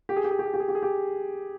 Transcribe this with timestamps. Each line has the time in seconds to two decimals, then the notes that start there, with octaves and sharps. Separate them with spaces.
0.09 G4
0.16 G#4
0.24 G4
0.31 G#4
0.39 G4
0.46 G#4
0.54 G4
0.60 G#4
0.68 G4
0.75 G#4
0.83 G4